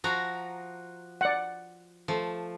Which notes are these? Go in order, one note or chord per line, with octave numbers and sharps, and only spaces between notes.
F3 F#4 A#5
D5 F#5
F3 A3